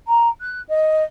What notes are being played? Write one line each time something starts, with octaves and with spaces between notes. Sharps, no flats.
A#5
F#6
D#5